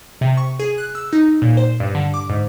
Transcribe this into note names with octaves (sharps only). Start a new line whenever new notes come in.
C3
C#6
G#4
F#6
E6
D#4
A#2
C5
G2
D3
D6
G#2